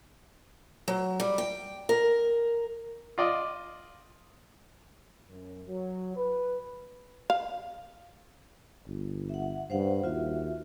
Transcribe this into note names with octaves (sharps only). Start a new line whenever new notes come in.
F#3
G3
G5
A#4
F4 D5 D#5
F#2
F#3
B4
F5
G1
E5 F#5
G2 C5 F5 F#5
D#2 F4 F#4 E5